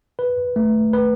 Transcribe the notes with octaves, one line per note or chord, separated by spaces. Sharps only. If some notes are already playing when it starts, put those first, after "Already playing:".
B4
A3
B4